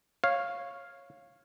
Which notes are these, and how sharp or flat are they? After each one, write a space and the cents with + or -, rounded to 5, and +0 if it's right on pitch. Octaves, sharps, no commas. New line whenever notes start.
C#5 -10 F5 +0